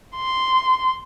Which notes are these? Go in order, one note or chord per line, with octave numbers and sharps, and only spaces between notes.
C6